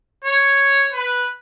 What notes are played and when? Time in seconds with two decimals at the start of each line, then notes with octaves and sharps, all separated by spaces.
0.24 C#5
0.93 B4